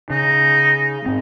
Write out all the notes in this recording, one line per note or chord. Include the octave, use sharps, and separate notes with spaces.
C#3 D#4
G#2 C4